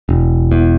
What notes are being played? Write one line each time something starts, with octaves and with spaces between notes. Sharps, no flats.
E1
E2